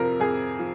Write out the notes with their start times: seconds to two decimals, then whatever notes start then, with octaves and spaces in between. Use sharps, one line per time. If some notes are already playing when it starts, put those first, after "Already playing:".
Already playing: F2 C3 F3 A#4
0.20 F2 G#4
0.59 F3